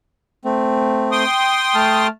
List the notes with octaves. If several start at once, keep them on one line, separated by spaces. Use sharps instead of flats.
A3 C4
G5 C6 D#6
A3 A5 F6